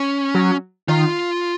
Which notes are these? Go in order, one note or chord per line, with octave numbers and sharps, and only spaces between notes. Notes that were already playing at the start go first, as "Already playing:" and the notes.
Already playing: C#4
F#3
D#3 F4